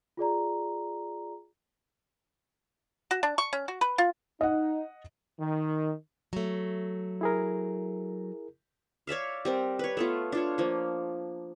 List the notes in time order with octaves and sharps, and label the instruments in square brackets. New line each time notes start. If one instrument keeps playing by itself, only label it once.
[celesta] F4 G#4 D5 A#5
[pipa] F#4
D4
C#6
C#4
F#4
B4
F4
[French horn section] D#4 [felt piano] D#5 F#5
[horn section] D#3
[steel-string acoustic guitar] F#3 A3
[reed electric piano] E4 G#4 A#4
[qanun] C#5 D5 E5 F5
G3 C4 A#4
B4 C#5
A3 B3 F4
D4 F4 C#5
F3 A#3